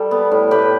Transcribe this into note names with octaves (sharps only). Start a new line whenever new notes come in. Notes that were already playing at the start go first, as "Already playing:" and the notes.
Already playing: G3 A4
B3
A2
A2 G4 B4